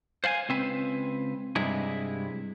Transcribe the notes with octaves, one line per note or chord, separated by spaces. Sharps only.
C5 F5 F#5 G#5
C#2 C4 B4
G2 C3 G#3 E4